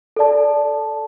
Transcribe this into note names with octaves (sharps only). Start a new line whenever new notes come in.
A4 D5 A5